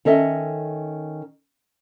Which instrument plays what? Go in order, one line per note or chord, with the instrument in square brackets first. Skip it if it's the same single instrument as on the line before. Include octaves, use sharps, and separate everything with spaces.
[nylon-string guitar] D#3 C#4 A4 D#5 E5